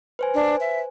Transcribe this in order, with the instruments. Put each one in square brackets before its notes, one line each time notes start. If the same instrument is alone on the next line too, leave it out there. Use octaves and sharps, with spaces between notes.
[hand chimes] B4 C5 G#5
[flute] D4
E5